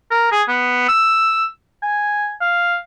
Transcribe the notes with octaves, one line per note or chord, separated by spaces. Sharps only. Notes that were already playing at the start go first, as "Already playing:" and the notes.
A#4
G#4
B3
E6
G#5
F5